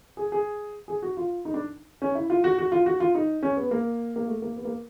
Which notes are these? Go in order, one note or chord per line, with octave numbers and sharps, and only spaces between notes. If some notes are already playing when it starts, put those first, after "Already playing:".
G#4
G#4
G#4
F#4
F4
D#4
D4
C#4
E4
F4
F#4
F#4
F4
F#4
F4
D#4
C#4
B3
A#3
A#3
A3
A#3
B3
A#3